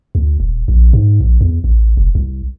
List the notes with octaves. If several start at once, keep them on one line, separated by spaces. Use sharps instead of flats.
D2
D#1
A#1
G#2
A#1
E2
A1
F1
C2